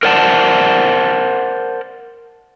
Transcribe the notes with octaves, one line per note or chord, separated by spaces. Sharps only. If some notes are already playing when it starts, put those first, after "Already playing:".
A#4 C5 D5 F#5 G5 A5